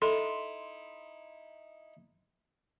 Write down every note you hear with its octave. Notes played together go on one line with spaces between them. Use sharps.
D#4 E4 A4 C6